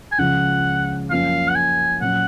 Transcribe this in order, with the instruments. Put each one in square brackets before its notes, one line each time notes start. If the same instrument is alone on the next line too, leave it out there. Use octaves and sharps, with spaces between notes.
[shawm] G#5
[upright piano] C#2 C#3 F3 [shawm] F#5
[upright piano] F#2 F3 A#3 C#4 [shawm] F5
[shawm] F#5
G#5
[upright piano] A#2 F#3 C#4 [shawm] F#5